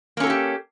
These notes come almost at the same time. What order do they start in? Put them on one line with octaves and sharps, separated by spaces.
A#3 C#4 A4 F#4 G4